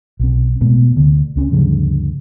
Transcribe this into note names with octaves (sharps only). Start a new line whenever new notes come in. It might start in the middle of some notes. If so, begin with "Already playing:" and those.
B1 C4
B2 G#3 A3 B3
D2 D3
C#2 C4 C#4
D2 G2 C#3 F3